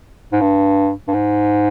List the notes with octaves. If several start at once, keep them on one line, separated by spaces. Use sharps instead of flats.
G#2
G2
G2
G#2